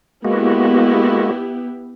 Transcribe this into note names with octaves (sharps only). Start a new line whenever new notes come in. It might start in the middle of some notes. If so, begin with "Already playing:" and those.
G#3 A#3 B3 E4 F#4 G4